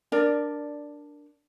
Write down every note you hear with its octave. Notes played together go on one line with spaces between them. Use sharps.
D4 A#4 D5